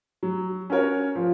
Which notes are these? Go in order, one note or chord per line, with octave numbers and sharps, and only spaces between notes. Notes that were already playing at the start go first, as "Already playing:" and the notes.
F#3
C#4 F#4 A#4 C#5
F3